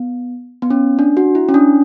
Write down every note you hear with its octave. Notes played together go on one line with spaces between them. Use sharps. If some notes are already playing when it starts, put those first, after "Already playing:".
Already playing: B3
B3
C#4
D4
F#4
E4
C#4
D4